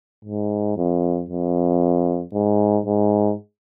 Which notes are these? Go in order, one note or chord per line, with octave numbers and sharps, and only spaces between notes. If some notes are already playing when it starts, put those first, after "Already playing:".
G#2
F2
F2
G#2
G#2